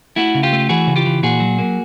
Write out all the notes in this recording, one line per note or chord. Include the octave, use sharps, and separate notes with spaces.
A3 E4 F#4
C#3
F4 G4
A3
E3 F#4 G#4
C#3
F4 G4
E3
A#2 F#4 G#4
F#3
A#3